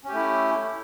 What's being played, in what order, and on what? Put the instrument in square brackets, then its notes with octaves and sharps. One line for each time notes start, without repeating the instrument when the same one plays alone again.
[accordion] C#4
G4
A3
E4